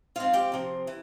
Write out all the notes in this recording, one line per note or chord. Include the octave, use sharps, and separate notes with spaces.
G#2 F3 C4 F4 F5
G4 G5
C3 F3 C4
E3